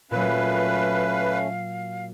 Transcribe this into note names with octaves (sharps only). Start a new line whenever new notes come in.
A#2 F#3 A3 C#4 B4 F5